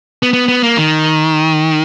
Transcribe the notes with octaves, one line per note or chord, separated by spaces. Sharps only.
B3
B3
B3
A#3
D#3